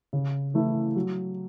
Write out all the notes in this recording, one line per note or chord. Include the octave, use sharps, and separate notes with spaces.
C#3
E3 A3 E4
F#3